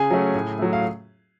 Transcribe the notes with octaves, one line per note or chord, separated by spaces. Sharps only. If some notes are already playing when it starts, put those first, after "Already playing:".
Already playing: C#3 G#4 G#5
F#3 A3 C#4
A2
F#3 A3
F5